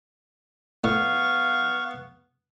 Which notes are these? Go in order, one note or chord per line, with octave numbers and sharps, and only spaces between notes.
A2 B3 F5 C#6